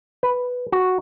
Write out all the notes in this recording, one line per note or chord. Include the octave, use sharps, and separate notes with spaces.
B4
F#4